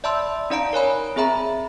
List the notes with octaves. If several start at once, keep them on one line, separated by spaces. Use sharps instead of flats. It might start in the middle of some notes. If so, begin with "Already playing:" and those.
D5 E5 A5 B5 C6 E6
C#4 D#4 D5 F5 A#5 D7
A#4 C#5 G#5 B5
C4 G#4 E5 A#5 B5